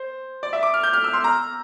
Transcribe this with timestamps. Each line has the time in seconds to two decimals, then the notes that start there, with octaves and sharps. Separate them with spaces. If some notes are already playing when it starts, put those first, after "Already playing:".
Already playing: C5
0.43 D5
0.53 E5
0.63 D6
0.74 F6
0.83 G6
0.93 F6
1.04 E6
1.13 C6
1.24 A#5